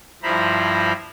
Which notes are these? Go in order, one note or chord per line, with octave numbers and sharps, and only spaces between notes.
G2 F3 E4 C5 A#5 B5